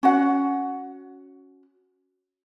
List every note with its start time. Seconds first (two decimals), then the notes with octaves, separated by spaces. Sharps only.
0.03 C#4 F#4 F#5